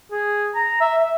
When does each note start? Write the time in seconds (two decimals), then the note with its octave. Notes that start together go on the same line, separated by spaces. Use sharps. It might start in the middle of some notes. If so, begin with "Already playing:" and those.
0.11 G#4
0.55 A#5
0.80 E5
0.99 E5